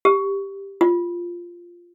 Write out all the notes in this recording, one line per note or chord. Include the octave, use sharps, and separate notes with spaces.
G4
F4